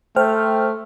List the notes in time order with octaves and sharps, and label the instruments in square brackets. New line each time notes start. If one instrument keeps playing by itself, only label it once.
[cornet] A3 [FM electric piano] C5 G5 F6